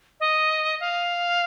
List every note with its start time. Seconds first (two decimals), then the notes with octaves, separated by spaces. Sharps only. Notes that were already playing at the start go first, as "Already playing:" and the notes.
0.20 D#5
0.80 F5